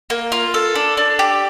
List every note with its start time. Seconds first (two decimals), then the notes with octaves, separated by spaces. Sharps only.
0.10 A#3
0.32 F4
0.54 A4
0.75 D4
0.97 D4
1.19 G4